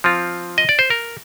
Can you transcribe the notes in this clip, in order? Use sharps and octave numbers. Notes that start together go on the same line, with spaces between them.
F3 C4 F4
D#5
D5
C5
A#4